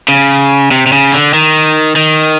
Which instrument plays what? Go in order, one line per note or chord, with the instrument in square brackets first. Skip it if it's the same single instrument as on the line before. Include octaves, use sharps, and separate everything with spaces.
[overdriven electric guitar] C#3
C3
C3
C#3
D3
D#3
D#3